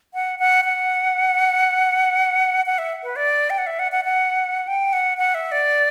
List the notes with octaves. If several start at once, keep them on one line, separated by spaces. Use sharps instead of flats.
F#5
F#5
F#5
F#5
E5
B4
D5
G5
F#5
E5
F#5
F#5
F#5
G5
F#5
F#5
E5
D5